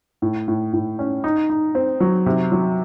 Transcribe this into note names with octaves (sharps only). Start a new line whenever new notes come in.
A2
A2
A2
C#4
D#4
D#4
C4
F#3
C3
F#3